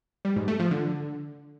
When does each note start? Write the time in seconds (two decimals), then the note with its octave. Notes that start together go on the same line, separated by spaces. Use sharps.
0.25 G3
0.36 G#2
0.48 A3
0.59 F3
0.71 D3